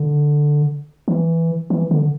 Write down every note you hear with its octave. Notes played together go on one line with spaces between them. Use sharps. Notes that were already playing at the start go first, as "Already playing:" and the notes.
Already playing: D3
E3
E3
D3